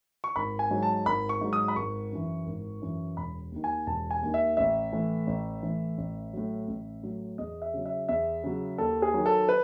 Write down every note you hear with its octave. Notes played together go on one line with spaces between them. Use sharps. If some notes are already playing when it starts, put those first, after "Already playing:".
C#6
G#1 B5
G#5
G#2 F#3
A5
G#1 B5
C#6
G#2 F#3
D#6
B5
G#1 C#6
F#2 E3
G#1
F#2 E3
E1 B5
D#2 D#3
G#5
E1 A5
G#5
D#2 D#3
E5
A1 E5
A2 E3
A1
A2 E3
A1
A2 F#3
A1
A2 F#3
E2 D#5
E5
C#3 F#3
E5
E2 E5
C#3 F#3
D#2 A4
G#4
D#3 F#3
A4
B4